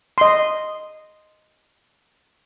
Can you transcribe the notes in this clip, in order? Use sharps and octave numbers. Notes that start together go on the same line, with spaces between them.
D#5 C6